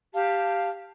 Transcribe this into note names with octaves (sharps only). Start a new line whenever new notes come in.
G4 F5 A5